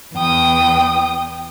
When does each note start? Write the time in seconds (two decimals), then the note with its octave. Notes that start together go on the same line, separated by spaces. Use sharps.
0.14 E2 G5 D#6